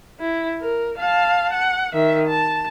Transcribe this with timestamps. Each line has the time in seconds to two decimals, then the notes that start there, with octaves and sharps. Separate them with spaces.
0.20 E4
0.61 A#4
0.98 F5 A5
1.53 F#5
1.94 D#3 E5
2.27 A5